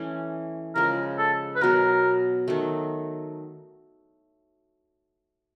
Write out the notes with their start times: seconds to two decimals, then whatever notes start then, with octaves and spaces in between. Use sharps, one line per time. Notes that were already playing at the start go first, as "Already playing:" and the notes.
Already playing: E3 A3 C#4
0.75 C#3 F3 G#3 A#4
1.18 A4
1.56 B4
1.61 B2 F#3 B3 A#4
2.48 D#3 F#3 A3